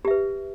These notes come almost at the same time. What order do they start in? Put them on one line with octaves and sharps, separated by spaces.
G4 E5 B4